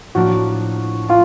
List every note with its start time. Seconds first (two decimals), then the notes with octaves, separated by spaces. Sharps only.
0.15 A2 F3 A#3 D4 F#4
1.08 D4 F4